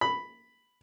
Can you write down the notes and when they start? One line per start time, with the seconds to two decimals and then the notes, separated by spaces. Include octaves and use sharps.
0.01 B5